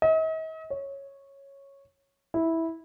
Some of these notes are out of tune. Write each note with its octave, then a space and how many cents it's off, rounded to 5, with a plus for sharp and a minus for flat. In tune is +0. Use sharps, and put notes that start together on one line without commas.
D#5 +45
C#5 -5
E4 -10